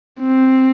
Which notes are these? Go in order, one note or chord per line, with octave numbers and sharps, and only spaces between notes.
C4